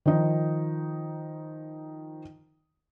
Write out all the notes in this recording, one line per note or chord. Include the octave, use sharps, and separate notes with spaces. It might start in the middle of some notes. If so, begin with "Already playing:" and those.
D#3 F3 D#4